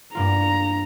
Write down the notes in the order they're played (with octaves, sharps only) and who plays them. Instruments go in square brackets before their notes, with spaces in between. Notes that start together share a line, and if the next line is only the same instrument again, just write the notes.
[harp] G2 A#3 F4 [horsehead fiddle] A#5